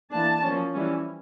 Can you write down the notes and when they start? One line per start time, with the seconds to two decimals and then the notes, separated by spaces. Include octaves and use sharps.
0.11 E3 A#3 D4 A5
0.42 F3 A#3 C#4
0.74 E3 G3 C#4